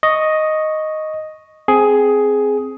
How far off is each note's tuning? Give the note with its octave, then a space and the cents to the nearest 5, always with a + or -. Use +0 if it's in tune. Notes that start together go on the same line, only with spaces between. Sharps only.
D#5 +0 C#6 +0
C4 +0 G#4 +10